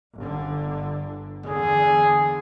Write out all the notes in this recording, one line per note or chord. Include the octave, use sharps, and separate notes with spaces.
G1 D3
E2 D3 G#4